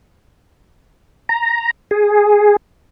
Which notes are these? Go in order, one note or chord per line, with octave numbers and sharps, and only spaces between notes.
A#5
G#4